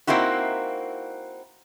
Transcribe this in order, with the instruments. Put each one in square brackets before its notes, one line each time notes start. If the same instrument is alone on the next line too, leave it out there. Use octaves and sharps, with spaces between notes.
[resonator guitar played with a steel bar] A#3 C4 D#4 E4 F#4